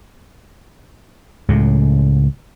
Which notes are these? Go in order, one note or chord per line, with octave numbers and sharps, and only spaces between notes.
C#2 A2 C#3